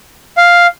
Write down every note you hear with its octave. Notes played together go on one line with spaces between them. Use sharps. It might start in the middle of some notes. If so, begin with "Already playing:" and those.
F5